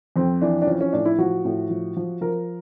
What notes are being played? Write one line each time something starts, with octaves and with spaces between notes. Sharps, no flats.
F2 C4
E3 D4
D4
F3 C#4
C#4
A2 D4
E4
F3 F#4
A2
F3
F3
F3 A#4